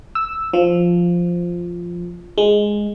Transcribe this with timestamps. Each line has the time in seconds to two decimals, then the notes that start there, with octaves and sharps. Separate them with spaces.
0.15 E6
0.53 F3
2.38 G#3